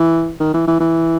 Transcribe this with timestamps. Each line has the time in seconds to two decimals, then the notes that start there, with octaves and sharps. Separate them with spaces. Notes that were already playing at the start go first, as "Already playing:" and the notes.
Already playing: E3
0.40 D#3
0.54 E3
0.67 E3
0.80 E3